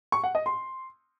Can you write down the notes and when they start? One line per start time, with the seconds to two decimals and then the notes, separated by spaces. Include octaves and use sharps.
0.12 C#6
0.24 F#5
0.35 D#5
0.46 C6